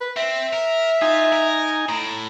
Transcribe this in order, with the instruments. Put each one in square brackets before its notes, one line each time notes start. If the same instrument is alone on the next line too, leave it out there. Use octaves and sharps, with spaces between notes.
[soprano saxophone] B4
[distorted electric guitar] C4 [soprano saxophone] E5
[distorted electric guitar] A#4
[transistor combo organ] D#4 G#5 [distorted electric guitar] F4
[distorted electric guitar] A#4
[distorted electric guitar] A2 [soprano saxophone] A#5